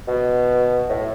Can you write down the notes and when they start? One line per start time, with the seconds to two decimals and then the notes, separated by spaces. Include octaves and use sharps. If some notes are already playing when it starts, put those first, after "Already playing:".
0.08 B2
0.89 A2